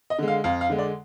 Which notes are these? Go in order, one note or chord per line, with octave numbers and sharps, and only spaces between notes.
D#5
D3 G#3
F5
F2 F5
F5
D3 G#3
D5